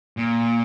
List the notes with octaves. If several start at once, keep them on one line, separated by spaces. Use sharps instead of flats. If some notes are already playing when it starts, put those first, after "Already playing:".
A#2